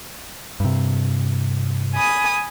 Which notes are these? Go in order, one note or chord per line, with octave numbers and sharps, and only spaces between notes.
G2 C3
G#5 B5 D#6